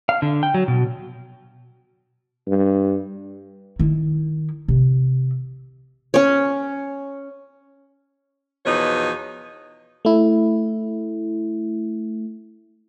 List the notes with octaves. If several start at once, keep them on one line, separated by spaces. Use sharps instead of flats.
F5
D3
G5
F#3
B2
G2
D#3 E4
C3
C#4 C#5
E2 B2 F3 D#4 B4 C#5
A3 E4